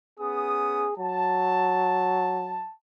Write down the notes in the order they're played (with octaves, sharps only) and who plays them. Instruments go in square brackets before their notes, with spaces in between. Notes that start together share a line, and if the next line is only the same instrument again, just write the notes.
[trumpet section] B3 C#4 D#6 [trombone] G#4
[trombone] F#3 [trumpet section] A5